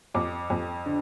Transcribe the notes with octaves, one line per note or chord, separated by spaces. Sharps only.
F2 D6
F2
D3